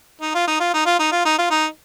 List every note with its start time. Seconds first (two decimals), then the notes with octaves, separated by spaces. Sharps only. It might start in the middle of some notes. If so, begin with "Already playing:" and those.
0.21 D#4
0.35 F4
0.47 D#4
0.60 F4
0.74 D#4
0.86 F4
0.99 D#4
1.12 F4
1.25 D#4
1.38 F4
1.50 D#4